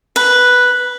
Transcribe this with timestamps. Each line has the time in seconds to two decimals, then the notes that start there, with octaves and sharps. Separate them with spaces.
0.16 B4